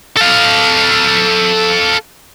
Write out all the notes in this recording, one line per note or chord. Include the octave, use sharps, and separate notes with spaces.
A4 F5